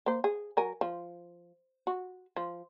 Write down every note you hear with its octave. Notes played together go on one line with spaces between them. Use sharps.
A#3 C5
G#4
F#3 A#4 G#5
F3
F#4
F3